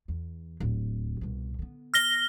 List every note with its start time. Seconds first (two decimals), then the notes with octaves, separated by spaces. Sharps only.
0.08 E2
0.60 D1
1.21 C2 B2
1.59 D3 B3
1.94 F6 A#6 G7